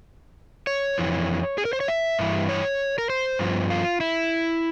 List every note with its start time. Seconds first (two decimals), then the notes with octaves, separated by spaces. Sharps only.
0.67 C#5
0.98 F2 E3
1.58 G#4
1.65 A#4
1.73 C5
1.80 C#5
1.88 E5
2.19 G2 E3
2.49 C#5
2.98 A#4
3.10 C5
3.39 G2 F3
3.70 F4
4.00 E4